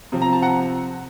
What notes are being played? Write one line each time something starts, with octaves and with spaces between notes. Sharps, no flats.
C3 F3 C4
A#5
A5
F#5 A#5